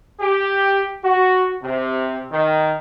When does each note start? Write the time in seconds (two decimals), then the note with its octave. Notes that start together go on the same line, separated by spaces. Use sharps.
0.19 G4
1.03 F#4
1.62 C3
2.30 D#3